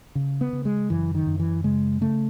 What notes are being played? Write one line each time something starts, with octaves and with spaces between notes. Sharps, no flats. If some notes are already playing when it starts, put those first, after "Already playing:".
C#3
B3
C#3
G#3
F#2 E3
D#3
F#2
E3
C#3 G#3
C#3 A3